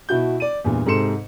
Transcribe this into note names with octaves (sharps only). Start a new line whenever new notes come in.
B2 E4 F#4 G6
D5 D#7
E2 G2 A#2
G#2 C3 A4 C6 C#7 E7